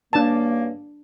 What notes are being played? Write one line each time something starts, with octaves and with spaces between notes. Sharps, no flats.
G2 C#3 A#3 D4 A5